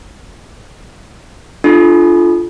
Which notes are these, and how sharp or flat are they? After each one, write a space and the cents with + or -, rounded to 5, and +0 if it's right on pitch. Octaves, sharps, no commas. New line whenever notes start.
D4 +20 F4 -15 A4 -25